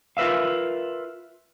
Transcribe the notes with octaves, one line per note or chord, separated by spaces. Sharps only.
F4 A#4 B4 E5 F5